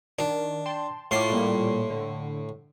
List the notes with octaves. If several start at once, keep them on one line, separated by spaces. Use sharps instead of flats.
D#3 D4
G5 A5 C6
A2 F4 C6 D6
A#2 G3 A#3
D3